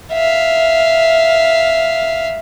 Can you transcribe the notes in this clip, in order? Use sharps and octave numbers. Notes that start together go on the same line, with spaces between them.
E5 F5